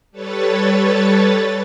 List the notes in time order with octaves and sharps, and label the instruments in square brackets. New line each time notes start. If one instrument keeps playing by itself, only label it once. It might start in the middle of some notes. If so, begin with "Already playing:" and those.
[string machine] G3 A4 B4 C#5 A6